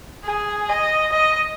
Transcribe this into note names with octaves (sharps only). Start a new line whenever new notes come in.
G#4
D#5
D#5